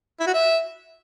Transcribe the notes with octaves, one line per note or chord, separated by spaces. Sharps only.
E4
F#4
E5